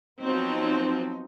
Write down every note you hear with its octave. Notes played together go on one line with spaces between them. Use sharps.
F3 F#3 B3 C4 D#4